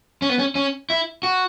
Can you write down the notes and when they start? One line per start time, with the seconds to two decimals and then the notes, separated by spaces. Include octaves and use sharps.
0.22 C#4
0.30 B3
0.39 C#4
0.55 C#4
0.90 E4
1.23 F#4